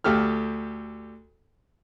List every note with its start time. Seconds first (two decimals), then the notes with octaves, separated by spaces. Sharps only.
0.04 D2 G4 A4 F6